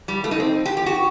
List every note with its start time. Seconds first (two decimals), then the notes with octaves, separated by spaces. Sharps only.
0.08 G3
0.24 A3
0.31 D#4
0.40 C4
0.65 G4
0.77 G4
0.86 F#4